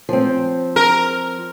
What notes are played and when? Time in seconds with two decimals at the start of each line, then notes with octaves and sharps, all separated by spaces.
0.09 F3 C4
0.76 A#4